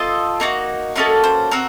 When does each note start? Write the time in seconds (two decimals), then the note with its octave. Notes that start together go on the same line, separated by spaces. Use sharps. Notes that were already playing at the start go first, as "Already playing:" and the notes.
Already playing: C4 F4 A4 D#5
0.40 A#3 D#4 F#4
0.96 A#3 C#4 F#4 A4 D#5
1.24 C5
1.51 C4 F#4 A#4